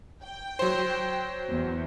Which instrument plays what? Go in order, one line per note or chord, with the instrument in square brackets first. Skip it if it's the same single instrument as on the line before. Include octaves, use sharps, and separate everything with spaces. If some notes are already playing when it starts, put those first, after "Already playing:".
[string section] G5
[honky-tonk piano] F#3 C5
[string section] E2